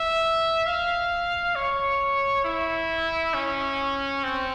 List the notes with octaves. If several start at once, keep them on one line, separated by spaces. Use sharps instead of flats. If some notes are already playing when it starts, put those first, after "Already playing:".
Already playing: E5
F5
C#5
E4
C#4
C4